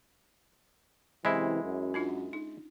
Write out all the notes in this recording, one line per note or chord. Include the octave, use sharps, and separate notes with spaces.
F#2 C3 E3 G#3 E4 C5 B5
F#2
C#4 D4 F4
D#4